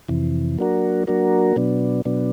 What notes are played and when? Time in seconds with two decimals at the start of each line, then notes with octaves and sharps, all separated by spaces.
0.08 F2 C3 E3
0.59 F#3 A#3 D4 F#4 A#4
1.07 F#3 A#3 D4 F#4 A#4
1.56 B2 F#3 B3 D4
2.05 B2 F#3 B3 D4